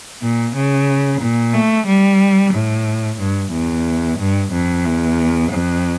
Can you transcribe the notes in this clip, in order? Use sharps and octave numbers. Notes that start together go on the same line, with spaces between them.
A#2
C#3
A#2
A3
G3
A2
G2
E2
G2
F2
E2
F2